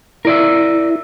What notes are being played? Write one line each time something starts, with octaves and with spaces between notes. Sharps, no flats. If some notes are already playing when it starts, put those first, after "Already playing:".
E4 A#4 D5 E5